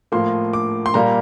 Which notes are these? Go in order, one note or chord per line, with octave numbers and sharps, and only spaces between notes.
A2 F3 A#3 C6
D6
C6
A#2 G3 A#3 A#5